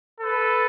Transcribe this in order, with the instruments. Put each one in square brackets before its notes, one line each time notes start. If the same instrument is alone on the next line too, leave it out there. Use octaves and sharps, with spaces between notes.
[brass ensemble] A4 B4